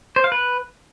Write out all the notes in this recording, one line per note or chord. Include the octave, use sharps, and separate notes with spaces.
C5
F5
B4